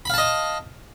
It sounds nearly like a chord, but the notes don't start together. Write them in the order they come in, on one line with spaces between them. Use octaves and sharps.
B5 F5 A5 D#5